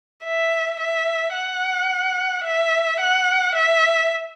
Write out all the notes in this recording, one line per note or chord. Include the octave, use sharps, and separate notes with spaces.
E5
E5
F#5
E5
F#5
E5